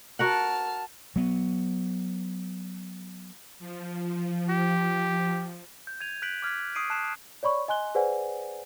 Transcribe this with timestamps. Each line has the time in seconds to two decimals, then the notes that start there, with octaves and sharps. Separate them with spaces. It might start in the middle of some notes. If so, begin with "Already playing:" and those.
0.19 F#4 A#4 F#5 A5 F6
1.16 F#3 B3
3.59 F3
4.49 G4
5.87 G6
6.01 G#6 D#7 F7
6.22 F#6 G6 B6 D7 F#7
6.42 D6 F6 G#6 B6
6.75 C#6 D#6 C7 D7 D#7
6.90 A5 F#6 C7 E7
7.43 C#5 D5 B5 C#6
7.68 D#5 G#5 C6 F#6 G7
7.95 G#4 B4 C5 D5 F#5 G#5